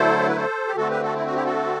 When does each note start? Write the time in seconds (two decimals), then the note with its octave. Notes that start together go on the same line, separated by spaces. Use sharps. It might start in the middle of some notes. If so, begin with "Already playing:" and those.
Already playing: D3 F#3 A3 E4 A4 C5
0.29 B4
0.36 A4 C5
0.68 G4
0.75 D3 A3 C4 F#4 A4
0.90 G4 B4
1.02 F#4 A4
1.16 E4
1.26 F#4
1.35 E4 G4
1.45 F#4 A4